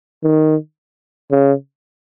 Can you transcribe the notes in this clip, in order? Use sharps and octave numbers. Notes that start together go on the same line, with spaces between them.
D#3
C#3